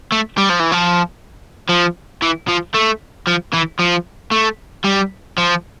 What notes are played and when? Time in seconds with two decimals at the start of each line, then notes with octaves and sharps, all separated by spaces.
0.12 A3
0.38 G3
0.50 F3
0.60 E3
0.72 F3
1.69 F3
2.22 E3
2.48 F3
2.74 A3
3.27 F3
3.54 E3
3.80 F3
4.32 A3
4.84 G3
5.38 F3